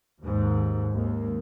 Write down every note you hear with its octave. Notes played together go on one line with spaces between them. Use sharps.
D#2 G#2
G#1 D#2 A#3